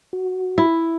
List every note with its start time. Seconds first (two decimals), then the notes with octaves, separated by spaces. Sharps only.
0.13 F#4
0.58 E4